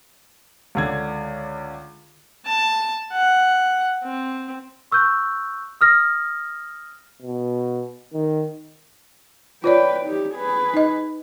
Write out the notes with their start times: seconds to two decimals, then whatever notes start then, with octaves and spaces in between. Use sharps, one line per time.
0.75 C#2 D3 G#6
2.46 A5
3.13 F#5
4.04 C4
4.92 C#6 E6 F#6 G6
5.81 D#6 F6 A#6
7.22 B2
8.14 D#3
9.64 F4 B4 C#5 D5 G5
10.06 D#4 G4
10.35 G#4 B4
10.74 D#4 D#5